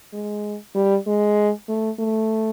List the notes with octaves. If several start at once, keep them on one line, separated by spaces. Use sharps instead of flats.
G#3
G3
G#3
A3
A3